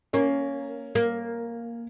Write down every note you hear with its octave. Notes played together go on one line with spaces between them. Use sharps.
A#3 C#4
A#3